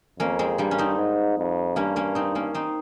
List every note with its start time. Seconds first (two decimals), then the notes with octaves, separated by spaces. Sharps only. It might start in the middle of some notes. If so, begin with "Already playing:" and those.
0.19 F2 A#3 C#4
0.39 G#3 C4
0.58 G2 G3 A#3
0.71 C#4
0.78 C4 D#4
0.98 G#2
1.38 F2
1.76 G2 A#3 C#4
1.96 A#3 C#4
2.15 C4 D#4
2.35 A#3 C#4
2.54 C4 D#4